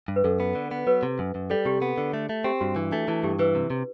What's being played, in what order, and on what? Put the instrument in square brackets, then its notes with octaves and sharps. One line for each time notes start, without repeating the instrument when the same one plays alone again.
[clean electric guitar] G2
[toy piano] B4
[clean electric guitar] F#2 [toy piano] A4
[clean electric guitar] B3
D3
B3
[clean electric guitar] F#3 [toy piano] B4
[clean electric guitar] C3
F#2
F#2
[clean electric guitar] G3 [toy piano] A4
[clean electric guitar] C3 [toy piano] G4
[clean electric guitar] B3
D3
A3
A3
[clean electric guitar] C4 [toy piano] G4
[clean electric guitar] G2 [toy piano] F#4
[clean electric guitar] E3 [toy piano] D4
[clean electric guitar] A3 [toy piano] D4
[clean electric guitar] E3 [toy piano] E4
[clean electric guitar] G2 [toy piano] G4
[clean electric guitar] E3 [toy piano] B4
[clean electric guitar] C3
C3